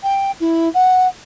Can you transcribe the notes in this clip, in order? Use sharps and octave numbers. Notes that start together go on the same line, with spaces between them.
G5
E4
F#5